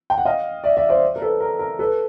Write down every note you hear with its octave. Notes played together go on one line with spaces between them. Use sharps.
G5
F#5
D#5 F5
D5 E5
D5 E5
C5 D5
A#4
A4 B4
A#4
A#4
A4 B4